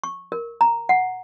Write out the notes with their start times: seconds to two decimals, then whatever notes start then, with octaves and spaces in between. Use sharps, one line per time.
0.04 C#6
0.32 A#4
0.61 A#5
0.89 F#5